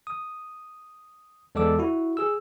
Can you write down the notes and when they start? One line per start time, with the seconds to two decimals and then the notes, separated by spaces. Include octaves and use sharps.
0.07 D#6
1.55 E2 G#3 A4 D5 D6 E6
1.79 E4 F#4
2.17 G#4 E6